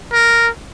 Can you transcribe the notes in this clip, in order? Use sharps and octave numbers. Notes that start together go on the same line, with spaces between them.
A#4